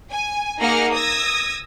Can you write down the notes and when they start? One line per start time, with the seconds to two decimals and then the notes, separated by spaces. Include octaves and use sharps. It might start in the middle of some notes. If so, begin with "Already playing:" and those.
0.10 G#5
0.61 A#3 D#4 G#4 A#4 F#5 F6
0.94 D#6 E6 G#6 A#6